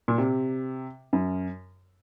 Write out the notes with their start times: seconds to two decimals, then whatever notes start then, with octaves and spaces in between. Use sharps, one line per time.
0.08 A#2
0.18 C3
1.13 F#2